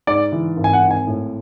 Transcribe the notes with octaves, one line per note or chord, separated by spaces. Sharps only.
G#2 D5
E3
G#1
G#5
F#5
G#1
G#5
A2